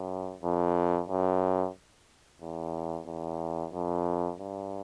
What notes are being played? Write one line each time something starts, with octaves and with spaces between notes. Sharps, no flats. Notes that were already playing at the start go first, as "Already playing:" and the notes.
Already playing: F#2
F2
F#2
E2
E2
F2
G2